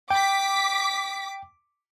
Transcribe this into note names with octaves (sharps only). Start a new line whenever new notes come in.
G5 D6 B6